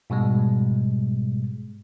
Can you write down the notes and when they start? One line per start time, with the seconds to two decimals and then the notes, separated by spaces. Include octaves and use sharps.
0.10 G#2 B2 G3 G#3